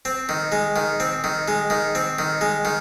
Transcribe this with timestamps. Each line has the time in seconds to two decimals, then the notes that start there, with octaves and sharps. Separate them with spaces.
0.05 C4
0.29 D#3
0.52 G#3
0.76 D#3
1.00 C4
1.24 D#3
1.48 G#3
1.70 D#3
1.95 C4
2.19 D#3
2.41 G#3
2.65 D#3